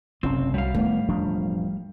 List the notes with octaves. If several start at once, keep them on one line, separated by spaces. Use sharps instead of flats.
F#1 C3 C4 C#4
C2 F#3 G3 F5
A2 D#3 B3
E1 F3 D4